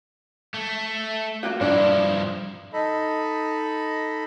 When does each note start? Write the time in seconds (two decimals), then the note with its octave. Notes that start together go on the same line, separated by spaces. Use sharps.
0.54 A3
1.43 A#3 F4 F#4
1.61 G2 F3 D4 E4
2.73 D#4 A4 D#5 B5